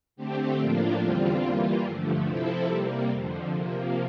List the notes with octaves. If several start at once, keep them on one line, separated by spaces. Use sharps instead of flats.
D3 A3 C4 G4
A2 F3 A#3 D4 F4
E2 D3 G3 C4 F4
E3 G3 A#3 F4
G2 D3 F3 A3
C3 F3 C4 E4 A4
C3 G3 A#3
F2 D3 F3
C3 F3 A#3